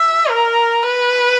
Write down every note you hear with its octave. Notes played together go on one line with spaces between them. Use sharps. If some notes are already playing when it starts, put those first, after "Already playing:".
Already playing: E5
A#4
B4